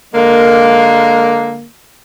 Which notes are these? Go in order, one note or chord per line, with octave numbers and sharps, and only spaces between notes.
D3 G#3 A#3